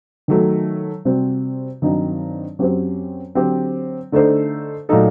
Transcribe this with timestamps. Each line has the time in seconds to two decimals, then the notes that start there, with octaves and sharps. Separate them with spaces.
0.28 D#3 F#3 A3
1.05 C3 G3 C4 F#4 C5
1.82 G2 D#3 F#3 C4 D#4
2.59 F#2 F#3 C4 G4 C5
3.35 D3 F#3 C4 G4
4.12 D3 A3 D#4 A4 C5
4.89 A#2 F#3 A3 D#4 A4